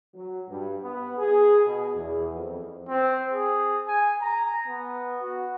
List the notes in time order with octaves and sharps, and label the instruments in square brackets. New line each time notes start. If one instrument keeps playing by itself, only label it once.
[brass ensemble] F#3
G2
B3
G#4
B2
E2
F2
[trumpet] C4
G#4
G#5
A#5
B3
F#4